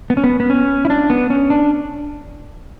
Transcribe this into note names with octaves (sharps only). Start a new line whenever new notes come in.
B3
C#4
B3
B3
C#4
E4
D4
B3
C#4
D4